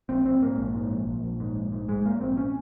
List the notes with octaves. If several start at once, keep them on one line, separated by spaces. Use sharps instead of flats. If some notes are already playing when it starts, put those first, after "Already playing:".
A#1 C4
A#1 C4
G#2 A#3
A#1
G#2
A#1
A#1
A#1
G#2
A#1
G#2
G#2 G#3
G#2 A#3
A#1 C4
C#4